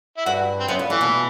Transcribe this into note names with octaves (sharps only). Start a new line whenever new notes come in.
E4
G2 F#4
C4
F#2 B3
G2
A2 E3
B2